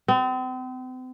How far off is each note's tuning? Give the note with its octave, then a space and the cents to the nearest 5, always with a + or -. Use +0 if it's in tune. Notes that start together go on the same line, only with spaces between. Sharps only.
C4 -40